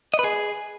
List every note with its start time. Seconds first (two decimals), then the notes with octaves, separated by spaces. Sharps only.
0.14 D#5
0.19 B4
0.24 G#4